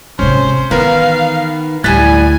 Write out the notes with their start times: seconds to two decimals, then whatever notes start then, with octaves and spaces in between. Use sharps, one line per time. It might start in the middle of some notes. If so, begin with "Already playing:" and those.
0.19 G#1 C3 C#4 C5
0.71 D#3 E3 B3 A#4 B4 F5
1.84 D2 A2 G3 G#5 F#6 A6 B6